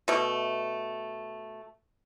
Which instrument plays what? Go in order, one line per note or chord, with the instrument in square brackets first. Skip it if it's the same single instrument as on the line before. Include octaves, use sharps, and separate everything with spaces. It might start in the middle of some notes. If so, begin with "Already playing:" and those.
[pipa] B2 A3